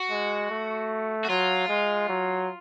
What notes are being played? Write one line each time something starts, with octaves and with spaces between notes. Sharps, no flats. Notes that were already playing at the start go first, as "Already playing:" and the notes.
Already playing: F#4
G#3
A3
F#4
F#3 F4
G#3
F#3